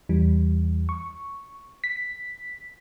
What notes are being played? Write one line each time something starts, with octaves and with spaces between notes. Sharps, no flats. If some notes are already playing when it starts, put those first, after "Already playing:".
E2 E3 G3
C#6
B6